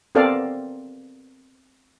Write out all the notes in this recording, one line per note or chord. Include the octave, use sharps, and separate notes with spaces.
B3 C4 A4 A#4 D5 F5